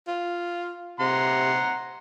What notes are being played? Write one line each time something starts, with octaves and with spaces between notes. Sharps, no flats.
F4
C3 F#5 A#5 C6